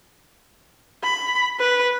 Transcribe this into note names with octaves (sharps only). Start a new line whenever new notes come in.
B5
B4